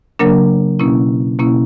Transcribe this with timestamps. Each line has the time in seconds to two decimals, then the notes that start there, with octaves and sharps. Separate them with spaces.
0.19 C#3 F#3 A#3 D4 A#4
0.79 B2 A#3 C#4 E4
1.39 B2 A#3 C#4 E4